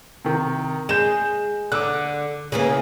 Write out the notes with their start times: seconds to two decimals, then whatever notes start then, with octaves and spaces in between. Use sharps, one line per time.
0.24 C3 D#3
0.89 G#3 G6 E7
1.72 D3 D6 E6 F#6
2.52 C#3 E3 A#3